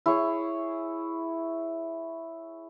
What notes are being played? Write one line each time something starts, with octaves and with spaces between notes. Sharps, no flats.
E4 G#4 C#5 C#6